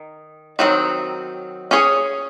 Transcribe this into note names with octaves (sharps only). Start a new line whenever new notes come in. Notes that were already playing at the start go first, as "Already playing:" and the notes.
Already playing: D#3
D#3 F#3 C4
C#4 G#4 C#5